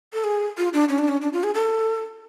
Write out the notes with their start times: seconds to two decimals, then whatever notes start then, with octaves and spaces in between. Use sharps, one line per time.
0.13 A4
0.24 G#4
0.58 F4
0.74 D4
0.89 C#4
0.99 D4
1.08 C#4
1.22 D4
1.33 F4
1.43 G#4
1.55 A4